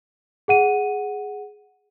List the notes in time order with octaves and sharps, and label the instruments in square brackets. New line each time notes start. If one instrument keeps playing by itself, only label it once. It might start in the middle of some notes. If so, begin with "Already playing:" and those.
[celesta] G#4 F#5 D#7